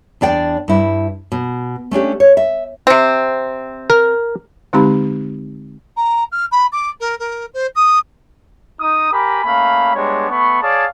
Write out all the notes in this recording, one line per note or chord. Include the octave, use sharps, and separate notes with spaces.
E2 D4 D5 G5
G2 E4
B2
A3 C#4 D4 G4
C#5
E5
C3 C4
A#4
D3 G#3 C4 D#4 G4 B5
A#5
F6
B5
D6
A#4
A#4
C5
D#6
D#4 D#6
G4 A#4 G#5 B5
A3 A#3 C#4 F5 B5
G3 G#3 B3 D4 C#5
A3 B3 B5 C#6
G#4 C#5 D5 F5 A5